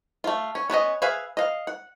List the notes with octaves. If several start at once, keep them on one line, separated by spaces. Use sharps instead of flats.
A3 F4
C#4
B3 C#4 E4 D#5
G#4 B4 E5 F5 G#5
D#5 F5
F#5